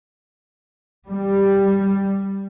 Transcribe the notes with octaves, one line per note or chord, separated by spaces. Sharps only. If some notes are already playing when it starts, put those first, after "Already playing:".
G3